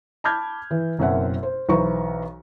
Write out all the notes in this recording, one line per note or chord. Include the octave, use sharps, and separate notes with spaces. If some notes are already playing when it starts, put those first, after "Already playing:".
A5 B5 D6 F6 G6 G#6
E3
F#1 F#2 B2 C4 E5 F#5
C5
B1 E3 B4 C5 A#5 C#6